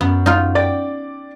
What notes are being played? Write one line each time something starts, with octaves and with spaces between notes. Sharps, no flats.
F#2 B3
D#4 F4
D5 G5 D6 A6